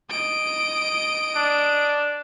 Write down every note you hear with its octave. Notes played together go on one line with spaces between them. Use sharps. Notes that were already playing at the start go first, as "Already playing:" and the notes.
D#5 D7
D4